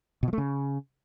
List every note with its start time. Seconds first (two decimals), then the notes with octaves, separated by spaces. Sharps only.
0.23 B2
0.28 F3
0.33 A3
0.38 C#3